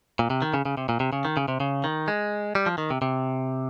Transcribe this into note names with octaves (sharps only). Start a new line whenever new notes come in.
A#2
C3
D#3
C#3
C#3
C3
A#2
C3
C#3
D#3
C#3
C3
C#3
D#3
G#3
G3
F3
D#3
C3
C3